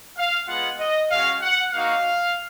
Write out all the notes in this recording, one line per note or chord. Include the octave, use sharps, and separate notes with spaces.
F5
G#3 B3 F4 F#5
D#5
G#3 C#4 F#4 F5
F#5
A#3 D#4 F#4 F5